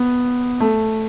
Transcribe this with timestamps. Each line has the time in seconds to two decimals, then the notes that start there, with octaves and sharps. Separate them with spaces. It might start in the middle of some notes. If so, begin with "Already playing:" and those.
Already playing: B3
0.60 A3